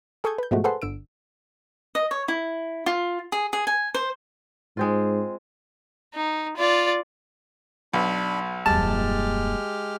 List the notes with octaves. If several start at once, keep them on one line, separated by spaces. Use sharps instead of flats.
G#4 A4 C#6 D#6 G6 G#6
B4 G6
G#2 B2 F3 G#3 A3 F#4
G#4 A4 B4 C5 F#5 C6
G1 D3 E6 D7
D#5
C#5
E4
F4
G#4
G#4
G#5
C5
G#2 G#3 C4 F4
D#4
F4 D5
B1 D4 B5
D#1 F#2 G#3 G4 A5 F6